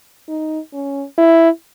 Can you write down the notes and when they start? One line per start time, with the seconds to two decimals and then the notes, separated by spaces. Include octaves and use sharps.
0.28 D#4
0.73 C#4
1.18 E4